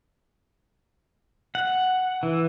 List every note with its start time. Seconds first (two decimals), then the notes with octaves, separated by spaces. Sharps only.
1.55 F#5
2.23 E3